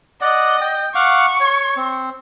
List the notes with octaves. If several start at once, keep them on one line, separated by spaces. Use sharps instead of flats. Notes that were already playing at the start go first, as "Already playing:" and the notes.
D5 D#5 F#5
G5
F5 F#5 C#6 D6
C#5
C4